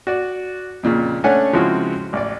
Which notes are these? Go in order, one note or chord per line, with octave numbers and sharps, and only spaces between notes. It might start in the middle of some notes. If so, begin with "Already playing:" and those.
F#4 D5
F2 A#2 C#3
A3 C#4 D4 C#5 F#5 G#5
C#3 F3 G#3 C4 E4 F#4
A1 D5